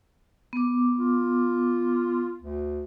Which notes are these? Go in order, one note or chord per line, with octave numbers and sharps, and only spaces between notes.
B3 D6
F4
D2